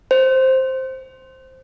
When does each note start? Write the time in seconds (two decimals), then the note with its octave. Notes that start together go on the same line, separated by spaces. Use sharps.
0.11 C5